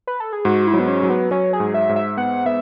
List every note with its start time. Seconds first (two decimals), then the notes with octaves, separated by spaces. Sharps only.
0.07 B4
0.20 A4
0.33 G#4
0.45 G#2 F#4
0.67 E4
0.74 F#3
0.79 B3
0.88 C#4
1.03 F#3
1.10 B3
1.31 F#3 C#4
1.53 G#4
1.60 G#2
1.74 E5
1.89 G#2
1.96 E5
2.17 B3 F#5
2.46 B3 E5